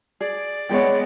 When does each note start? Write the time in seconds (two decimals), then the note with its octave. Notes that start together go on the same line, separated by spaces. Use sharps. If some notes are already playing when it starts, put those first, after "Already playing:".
0.21 G#4 D5
0.69 G#3 B3 C#5 G5